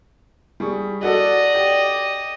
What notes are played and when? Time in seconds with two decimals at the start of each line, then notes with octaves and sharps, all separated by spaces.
0.60 G3 G#4 C#6
1.03 F#4 A4 D5 D#5
1.55 G4